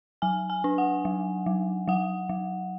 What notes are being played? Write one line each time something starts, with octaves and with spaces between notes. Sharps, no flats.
F#3 G#5
G#5
D4
F#5
F#3
F#3
F#3 F#5
F#3